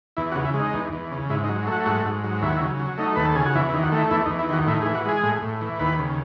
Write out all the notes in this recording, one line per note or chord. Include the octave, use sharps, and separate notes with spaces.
E2 E4
F#4
C#3
E4
G#3
D#4
E2
E2
C#3
G#2 E4
D#4
F#3
A3 F#4
G#2 F#4
G#2
F#3
D#2 E4
C#3
F#3
A3 D#4
D#2 B4
A4
C#3 G#4
F#4
E2 E4
E4
D#3
F#4
A3
E4
E2 E4
D#4
E2
E4
D#3 F#4
A2 E4
G#4
E3
F#4
G#3 G#4
A2
A2
E3
D#2 B4
C#3